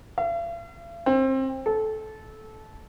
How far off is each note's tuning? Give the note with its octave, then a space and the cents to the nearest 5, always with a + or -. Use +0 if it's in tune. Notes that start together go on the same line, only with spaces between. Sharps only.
F5 -45
C4 +25
A4 -20